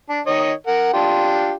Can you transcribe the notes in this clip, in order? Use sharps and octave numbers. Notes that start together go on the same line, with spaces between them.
D4
D#3 C#5 D#5
A#4 F#5
D4 F4 G4